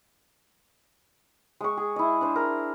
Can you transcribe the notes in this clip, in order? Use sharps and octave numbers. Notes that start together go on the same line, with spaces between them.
G#3 C#6
G#4
E4 D#5
D4 C5
A#4